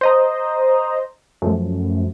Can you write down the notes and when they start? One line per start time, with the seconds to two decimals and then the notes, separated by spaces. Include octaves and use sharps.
0.01 C5 D#5 A#5
1.42 F#2 F3 A3